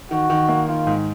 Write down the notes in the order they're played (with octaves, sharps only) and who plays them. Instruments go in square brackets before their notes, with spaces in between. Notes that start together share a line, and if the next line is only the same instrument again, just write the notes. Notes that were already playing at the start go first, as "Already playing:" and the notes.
[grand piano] D#3 [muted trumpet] F#4
[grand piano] D#3
A#3
[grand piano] D#3 [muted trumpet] F4
[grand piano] G#2